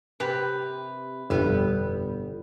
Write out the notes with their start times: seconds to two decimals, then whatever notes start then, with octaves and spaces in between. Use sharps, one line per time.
0.20 C3 G4 A#4 B4
1.30 G1 F2 B2 G3 B3 E4